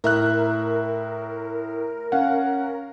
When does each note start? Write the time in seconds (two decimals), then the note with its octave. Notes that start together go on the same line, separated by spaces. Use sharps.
0.04 A2 A#4 E5 F#6
2.12 C#4 F5 F#5